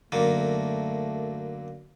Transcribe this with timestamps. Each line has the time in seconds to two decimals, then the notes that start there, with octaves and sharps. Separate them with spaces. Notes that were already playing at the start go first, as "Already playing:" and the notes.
0.12 F#2 D3 A3 A#3